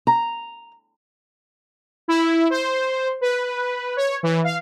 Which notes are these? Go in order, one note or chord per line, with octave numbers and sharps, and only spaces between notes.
A#5
E4
C5
B4
C#5
E3
F5